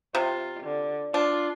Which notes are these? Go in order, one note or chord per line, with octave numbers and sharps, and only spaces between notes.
C3 F4
D3
D4 F4